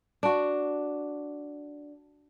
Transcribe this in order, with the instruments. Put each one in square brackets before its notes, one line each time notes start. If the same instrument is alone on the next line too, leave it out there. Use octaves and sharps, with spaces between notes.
[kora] D4 F#4